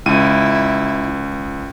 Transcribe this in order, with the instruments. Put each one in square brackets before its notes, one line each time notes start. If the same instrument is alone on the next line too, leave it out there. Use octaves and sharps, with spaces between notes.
[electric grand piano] C#2 D#7 [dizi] E4